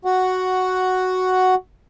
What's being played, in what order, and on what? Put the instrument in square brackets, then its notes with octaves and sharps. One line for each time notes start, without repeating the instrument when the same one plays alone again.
[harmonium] F#4 F#5